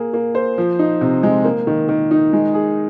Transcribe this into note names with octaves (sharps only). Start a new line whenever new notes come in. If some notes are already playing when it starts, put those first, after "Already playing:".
Already playing: A#3 G#4
A#3
C5
F3
D#4
C3
G#3
A#3
D#3
D#3
D#4
G#3
G#4